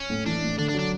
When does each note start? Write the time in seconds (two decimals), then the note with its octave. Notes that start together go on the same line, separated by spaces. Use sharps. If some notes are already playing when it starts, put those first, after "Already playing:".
Already playing: C#4
0.10 A2
0.26 E3 D4
0.42 A2
0.58 D3 D4
0.69 D4
0.74 F#3
0.79 D4